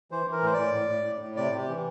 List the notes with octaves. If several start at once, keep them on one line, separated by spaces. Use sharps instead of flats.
E3 C5
E3
A#4
A2 C5
A2 D5
A2
A2
A2
A2
C3 D5
C3
G4
E3